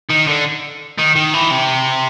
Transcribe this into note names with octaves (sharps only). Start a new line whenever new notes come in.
D#3
D3
D#3
D#3
E3
C3